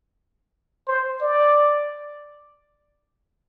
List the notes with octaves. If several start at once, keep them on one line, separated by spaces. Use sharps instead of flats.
C5
D5